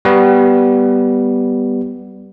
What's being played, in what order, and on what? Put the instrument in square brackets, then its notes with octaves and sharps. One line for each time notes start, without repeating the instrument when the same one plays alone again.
[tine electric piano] G3 B3